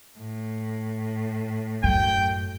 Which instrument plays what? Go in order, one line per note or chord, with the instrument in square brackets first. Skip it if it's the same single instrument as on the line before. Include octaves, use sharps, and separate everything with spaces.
[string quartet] A2
[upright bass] F#2 [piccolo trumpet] G5